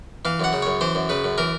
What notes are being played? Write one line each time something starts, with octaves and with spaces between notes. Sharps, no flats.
E3 F5
F#2 F#5
C#3
F#2 C#5
E3 C5
F#2
C#3 B4
F#2
E3 A#4